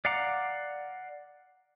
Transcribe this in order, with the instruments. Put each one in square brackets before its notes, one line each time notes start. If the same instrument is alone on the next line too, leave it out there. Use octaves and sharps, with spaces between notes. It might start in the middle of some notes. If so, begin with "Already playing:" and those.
[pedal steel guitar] D5 F5 F#5 A#5 D6